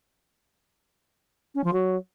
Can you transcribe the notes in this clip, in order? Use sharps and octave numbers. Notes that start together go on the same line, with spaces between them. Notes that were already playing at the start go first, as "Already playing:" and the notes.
C#4
F3
F#3